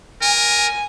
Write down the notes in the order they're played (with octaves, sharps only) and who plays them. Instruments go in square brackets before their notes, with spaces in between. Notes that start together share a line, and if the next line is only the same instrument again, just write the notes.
[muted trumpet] A#4 [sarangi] G#5